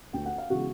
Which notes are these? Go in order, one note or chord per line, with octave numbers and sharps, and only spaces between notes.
D2 G5
F#5
F5
C#3 E3 G#3 B3 F#4 F#5